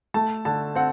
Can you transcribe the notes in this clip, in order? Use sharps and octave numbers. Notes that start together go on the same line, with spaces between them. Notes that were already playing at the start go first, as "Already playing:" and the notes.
A3 A5
D3 A5
C4 F#5